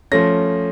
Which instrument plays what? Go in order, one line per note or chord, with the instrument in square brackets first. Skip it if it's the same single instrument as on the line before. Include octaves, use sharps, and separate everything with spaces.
[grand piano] F3 A3 C#4 A#6